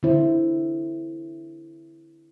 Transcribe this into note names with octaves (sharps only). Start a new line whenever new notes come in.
D3 C4 E4 C5